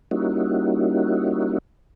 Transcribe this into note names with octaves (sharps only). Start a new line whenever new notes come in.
G3 A#3 C#4 D#4 E4 F#4